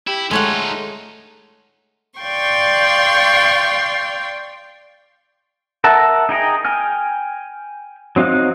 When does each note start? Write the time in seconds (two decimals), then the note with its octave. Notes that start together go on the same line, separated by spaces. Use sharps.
0.07 E4 G4
0.31 G#3 A3 D#4 F4 C#5 F#5
2.19 D5 F5 G5 C6 C#6
5.84 A#4 E5 F#5 A5
6.29 D#4 G#4 G5 A#5
6.65 G5 G#5 F6
8.16 F#3 C4 D#4 F5 F#6